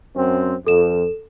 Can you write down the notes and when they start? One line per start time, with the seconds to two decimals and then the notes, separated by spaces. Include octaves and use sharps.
0.17 F#2 C4
0.67 F2 A4 E7